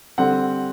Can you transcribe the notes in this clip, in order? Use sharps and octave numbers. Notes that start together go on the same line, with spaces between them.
D3 G3 C4 F#5